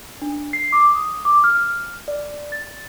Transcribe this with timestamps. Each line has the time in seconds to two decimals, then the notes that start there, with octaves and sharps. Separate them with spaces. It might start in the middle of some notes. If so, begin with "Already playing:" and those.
0.22 D4
0.53 C7
0.73 D6
0.95 D#6
1.25 D6
1.44 F6
1.57 F6
2.08 D5
2.52 A6